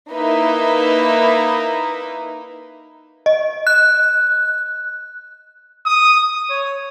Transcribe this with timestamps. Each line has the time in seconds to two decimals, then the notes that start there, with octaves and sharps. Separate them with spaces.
0.10 A#3 D#4 E4 B4 E5
3.26 D#5
3.67 F#6
5.85 D#6
6.50 C#5